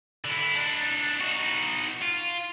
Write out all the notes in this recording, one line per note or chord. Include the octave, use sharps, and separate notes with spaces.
D3 E4
D4 D#4
D#4 F#4
F4